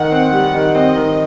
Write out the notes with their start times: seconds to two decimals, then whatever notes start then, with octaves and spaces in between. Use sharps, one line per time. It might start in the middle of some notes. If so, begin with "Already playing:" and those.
Already playing: D#3 F#5
0.11 C4
0.33 G3
0.54 D#3
0.75 C4 D#5
0.96 D#3